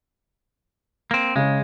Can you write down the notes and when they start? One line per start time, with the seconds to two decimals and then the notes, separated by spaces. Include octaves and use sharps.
1.11 A#3 C4
1.36 C#3 G#3